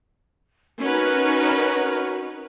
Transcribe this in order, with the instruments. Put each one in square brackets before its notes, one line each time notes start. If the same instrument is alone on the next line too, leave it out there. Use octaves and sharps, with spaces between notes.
[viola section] C#4 D#4 B4 [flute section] F#4 A#4